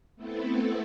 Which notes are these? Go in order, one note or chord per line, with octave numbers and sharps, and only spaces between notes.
A3 B3 C4 E4 A4